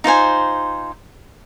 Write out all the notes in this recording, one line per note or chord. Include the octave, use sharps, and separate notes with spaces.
D#4 F4 C5 G#5